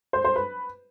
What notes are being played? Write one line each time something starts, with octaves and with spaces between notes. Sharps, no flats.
C5
C5
B4